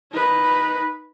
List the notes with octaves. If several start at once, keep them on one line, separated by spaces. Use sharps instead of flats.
D#4 B4